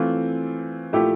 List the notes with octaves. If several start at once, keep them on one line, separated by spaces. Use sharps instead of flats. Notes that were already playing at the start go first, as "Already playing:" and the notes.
Already playing: E3 A3 C4 F4
A#2 F3 A3 E4 G4